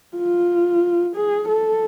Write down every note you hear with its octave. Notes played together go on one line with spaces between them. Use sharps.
F4
G#4
A4